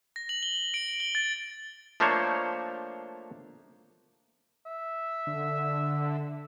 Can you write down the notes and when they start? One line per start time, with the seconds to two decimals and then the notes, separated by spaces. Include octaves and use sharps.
0.16 A#6
0.29 F#7
0.43 G7
0.74 D7
1.00 G7
1.15 A6
2.00 F3 A3 A#3 D4 C5 C#5
4.66 E5
5.27 D3